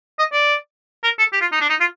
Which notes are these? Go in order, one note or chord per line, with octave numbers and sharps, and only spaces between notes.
D#5
D5
A#4
A4
G4
F4
D#4
D4
D#4
F4